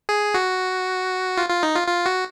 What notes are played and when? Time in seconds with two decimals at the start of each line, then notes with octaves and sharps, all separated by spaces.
0.09 G#4
0.34 F#4
1.37 F4
1.49 F4
1.63 D#4
1.75 F4
1.88 F4
2.06 F#4